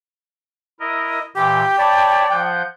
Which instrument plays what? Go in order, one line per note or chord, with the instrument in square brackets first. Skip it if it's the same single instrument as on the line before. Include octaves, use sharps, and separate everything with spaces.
[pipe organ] E4 A#4 D#5
[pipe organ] A#2 E3 [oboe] G4 [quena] G5
[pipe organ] C#5 A5 B5 [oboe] D5
[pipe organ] F3 F#5 G6